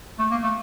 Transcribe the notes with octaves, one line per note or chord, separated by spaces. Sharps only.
A3
A#3
A3